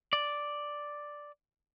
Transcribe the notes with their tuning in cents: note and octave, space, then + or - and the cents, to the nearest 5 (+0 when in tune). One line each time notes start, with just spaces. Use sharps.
D5 +0